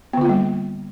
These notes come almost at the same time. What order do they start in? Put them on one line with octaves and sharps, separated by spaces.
B3 D3 F4 A#3 G3